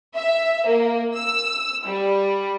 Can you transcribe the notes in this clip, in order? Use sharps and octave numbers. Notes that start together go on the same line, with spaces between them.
E5
A#3
E6
G3